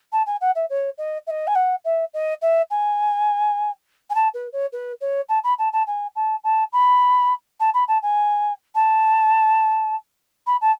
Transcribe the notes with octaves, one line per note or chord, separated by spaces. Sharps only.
A5
G#5
F#5
E5
C#5
D#5
E5
D#5
G#5
F#5
E5
D#5
E5
G#5
G#5
A5
B4
C#5
B4
C#5
A5
B5
A5
A5
G#5
A5
A5
B5
A5
B5
A5
G#5
A5
B5
A5